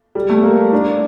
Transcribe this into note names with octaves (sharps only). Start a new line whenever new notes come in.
G3
A3
A#3
D4